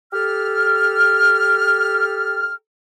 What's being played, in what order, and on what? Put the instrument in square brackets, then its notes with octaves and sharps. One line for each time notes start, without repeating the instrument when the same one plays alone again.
[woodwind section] G4 A4 F6